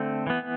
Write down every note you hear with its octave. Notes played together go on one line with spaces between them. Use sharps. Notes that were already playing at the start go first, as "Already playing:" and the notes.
Already playing: D3 A3 C4
E3 B3